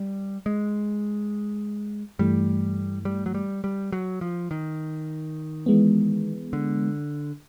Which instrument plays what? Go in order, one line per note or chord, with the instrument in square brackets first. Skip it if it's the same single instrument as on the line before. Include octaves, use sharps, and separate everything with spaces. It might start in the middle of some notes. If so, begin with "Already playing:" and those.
Already playing: [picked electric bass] G3
G#3
[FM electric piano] G2 E3 A3 [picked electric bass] G3
[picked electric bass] G3
F#3
G3
G3
F#3
F3
D#3
[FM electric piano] E3 G#3 B3
[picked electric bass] D3